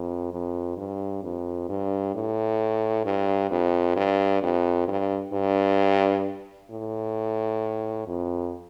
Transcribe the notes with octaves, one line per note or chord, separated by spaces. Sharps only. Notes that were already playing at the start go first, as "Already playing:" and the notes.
Already playing: F2
F2
G2
F2
G2
A2
G2
F2
G2
F2
G2
G2
A2
F2